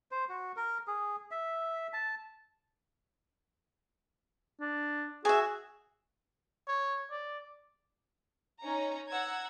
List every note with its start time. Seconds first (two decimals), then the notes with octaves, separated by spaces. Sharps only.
0.11 C5
0.29 F#4
0.56 A#4
0.87 G#4
1.31 E5
1.93 A5
4.60 D4
5.25 F#4 G#4 E5 G#5
6.67 C#5
7.11 D5
8.63 C#4 D#4 C#5 A#5
9.09 F#5 A#5 E6 G#6